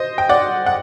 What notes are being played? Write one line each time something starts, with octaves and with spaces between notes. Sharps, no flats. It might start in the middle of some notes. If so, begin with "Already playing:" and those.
Already playing: C5 D#5
G5
D5 F#5
F#5